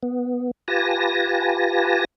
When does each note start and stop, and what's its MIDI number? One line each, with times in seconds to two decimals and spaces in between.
0.03 0.51 59
0.68 2.05 65
0.68 2.05 67
0.68 2.05 71
0.68 2.05 80
0.68 2.05 81
0.68 2.05 94